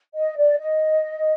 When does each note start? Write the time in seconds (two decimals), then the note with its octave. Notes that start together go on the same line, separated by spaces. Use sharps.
0.15 D#5
0.36 D5
0.58 D#5